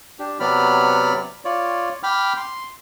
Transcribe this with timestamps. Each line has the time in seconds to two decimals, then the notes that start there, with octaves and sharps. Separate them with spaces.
0.19 D4 G4
0.40 C3 F#3 B3 D5 B5 F6
1.45 F4 C#5 D5
2.03 G5 B5 D6 F6
2.37 C6